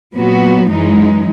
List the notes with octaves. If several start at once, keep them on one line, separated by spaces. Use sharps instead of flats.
A#2 F#3 B3 F#4
F#2 E3 G#3 D#4